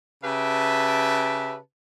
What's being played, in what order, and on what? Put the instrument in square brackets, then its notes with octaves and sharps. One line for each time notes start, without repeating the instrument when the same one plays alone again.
[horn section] C#3 G4 B4 E5 A5